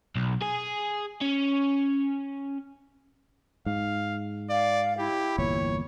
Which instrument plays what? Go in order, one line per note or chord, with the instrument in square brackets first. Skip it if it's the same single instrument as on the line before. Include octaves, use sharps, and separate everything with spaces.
[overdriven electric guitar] B1
G#4 G#5
C#4
[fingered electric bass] G#2 [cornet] F5
[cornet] D5 [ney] F5
[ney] E4 [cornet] G4
[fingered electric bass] G1 E2 A#2 [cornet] C#5